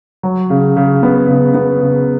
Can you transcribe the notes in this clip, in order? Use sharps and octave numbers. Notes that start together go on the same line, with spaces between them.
F#3
C#3
C#3
B3
C#3
B3
C#3